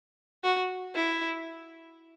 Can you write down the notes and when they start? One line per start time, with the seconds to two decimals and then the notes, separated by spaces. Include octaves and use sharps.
0.44 F#4
0.94 E4